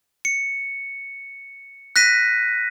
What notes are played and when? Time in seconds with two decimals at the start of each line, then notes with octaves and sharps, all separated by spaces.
0.25 C#7
1.96 F#6 A#6 B6 D#7